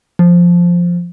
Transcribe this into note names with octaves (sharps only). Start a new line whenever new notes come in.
F3